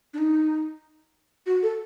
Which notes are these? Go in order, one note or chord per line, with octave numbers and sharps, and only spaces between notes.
D4
D#4
F#4
A4